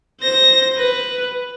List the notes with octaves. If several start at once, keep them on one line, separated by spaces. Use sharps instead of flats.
C5 A#6
B4